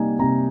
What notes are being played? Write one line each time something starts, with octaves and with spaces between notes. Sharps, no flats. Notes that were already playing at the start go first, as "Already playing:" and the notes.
Already playing: C3 G3 A#3 D#4 G#5
C3 A#5